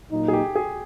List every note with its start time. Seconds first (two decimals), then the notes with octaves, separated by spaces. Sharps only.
0.11 A#2 F#3 A#3 D#4
0.28 G#4
0.33 G4
0.56 G#4